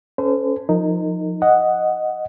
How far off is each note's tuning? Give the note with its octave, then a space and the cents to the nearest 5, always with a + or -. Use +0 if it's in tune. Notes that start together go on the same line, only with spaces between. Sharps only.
C#4 +0 A4 +0 C5 -35
F3 +20 D#4 +0 A#4 -25
D#5 +0 F#5 +0